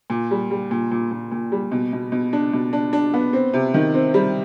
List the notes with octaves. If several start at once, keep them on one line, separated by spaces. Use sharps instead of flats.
A#2
G3
G3
A#2
A#2
A#2
A#2
G3
B2
B2
B2
D4
B2
D4
D4
B3
C4
C3
D#3
C4
G3